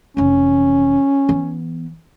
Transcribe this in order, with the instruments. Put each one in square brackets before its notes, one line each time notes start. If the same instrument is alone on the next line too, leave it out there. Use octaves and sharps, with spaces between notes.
[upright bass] F1 E3 [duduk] C#4
[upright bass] E3 B3